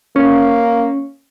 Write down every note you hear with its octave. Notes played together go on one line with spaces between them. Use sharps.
A#3 C#4